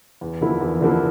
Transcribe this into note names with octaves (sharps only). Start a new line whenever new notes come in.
E2
D3 F3 A#3 E4
E2
D3 F3 A#3 E4